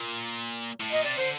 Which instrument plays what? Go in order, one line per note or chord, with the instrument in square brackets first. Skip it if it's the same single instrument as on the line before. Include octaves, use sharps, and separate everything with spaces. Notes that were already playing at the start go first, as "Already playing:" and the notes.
Already playing: [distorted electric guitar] A#2
A2
[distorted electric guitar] A#2 [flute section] D#5
[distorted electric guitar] C3 [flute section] D5
[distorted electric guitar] D3 [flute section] C5